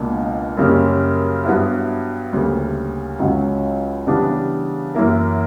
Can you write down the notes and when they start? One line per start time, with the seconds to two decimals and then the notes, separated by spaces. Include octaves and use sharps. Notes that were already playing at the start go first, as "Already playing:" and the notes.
Already playing: C#2 B2 A#3 D4
0.57 F#2 C#3 G3 A#3 C#4
1.45 G2 F#3 B3 E4
2.33 D2 C#3 G3 A#3
3.20 C#2 C#3 F#3 C#4
4.07 C#3 E3 G3 B3 D4
4.94 F#2 E3 A#3 E4 A#4